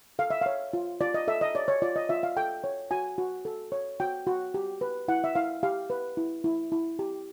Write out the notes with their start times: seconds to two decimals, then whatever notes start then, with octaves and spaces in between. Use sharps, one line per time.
0.19 A4 F5
0.30 E5
0.41 C#5 F5
0.73 F4
1.01 F4 D5
1.14 D#5
1.28 A4 E5
1.41 D#5
1.55 C#5 D5
1.68 C#5
1.82 F4 D5
1.96 D#5
2.09 F4 E5
2.23 F5
2.37 A4 G5
2.64 C#5
2.91 F#4 G#5
3.18 F#4
3.45 A4
3.72 C#5
4.00 F#4 G5
4.27 F#4
4.54 G4
4.81 B4
5.08 E4 F#5
5.24 E5
5.35 E4 F5
5.63 G4 F5
5.90 B4
6.17 E4
6.44 E4
6.72 E4
6.99 G4